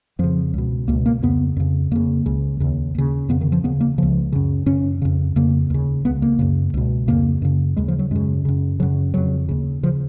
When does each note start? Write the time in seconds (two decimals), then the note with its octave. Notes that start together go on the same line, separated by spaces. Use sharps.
0.19 F2 C#3 F3
0.54 C#2 B2
0.88 C#2 B2 A#3
1.06 A#3
1.22 F2 C#3 B3
1.57 F2 C#3
1.91 F2 C#3 A#3
2.26 C#2 C#3
2.60 D#2 C#3
2.95 D#2 C#3
3.29 F2 C#3 B3
3.41 D#3
3.52 F3
3.64 D#2 C#3 B3
3.81 A#3
3.98 C#2 C#3 F3
4.32 F#2 C#3
4.66 F#2 C#3 C#4
5.02 F2 C#3
5.36 F2 C#3 A#3
5.70 D#2 C#3
6.05 C#2 C#3 B3
6.22 A#3
6.39 F#2 C#3
6.74 C#2 B2
7.08 F2 C#3 A#3
7.42 F#2 C#3
7.76 D#2 C#3 G#3
7.88 F3
7.99 F#3
8.11 F#2 C#3 G#3
8.45 F#2 C#3
8.80 C#3 F#3
8.83 F#2
9.14 F2 C#3 F#3
9.49 D#2 C#3
9.83 C#3 F3